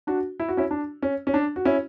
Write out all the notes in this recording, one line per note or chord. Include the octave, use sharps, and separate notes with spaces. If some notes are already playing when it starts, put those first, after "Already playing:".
D4 F#4
E4
F#4
C#4 E4
D4
C#4
C#4
D4
F#4
C#4 E4